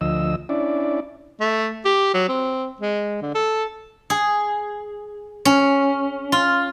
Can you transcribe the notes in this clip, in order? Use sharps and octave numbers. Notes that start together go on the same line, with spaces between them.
D2 F3 D#5 E6
C#4 D4 E4 D5
A3
G4
F#3
C4
G#3
D3
A4
G#4
C#4
F4